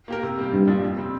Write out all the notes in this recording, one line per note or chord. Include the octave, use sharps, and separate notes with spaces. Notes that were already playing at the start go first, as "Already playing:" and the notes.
A#3 G4 A#4
C3
G3 A#3 G4
A#1 G2
A#2 F3 D4
F2
C3 G3 C4